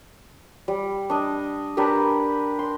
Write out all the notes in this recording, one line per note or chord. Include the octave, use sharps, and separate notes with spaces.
G3
D4 D#5
D4 G4 A#4 B4
C6